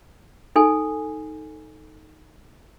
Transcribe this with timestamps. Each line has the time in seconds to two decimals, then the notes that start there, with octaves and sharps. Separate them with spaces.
0.56 D#4 A4 G#5